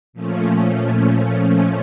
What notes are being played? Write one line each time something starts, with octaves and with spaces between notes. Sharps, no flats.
A#2 F3 A3 C#4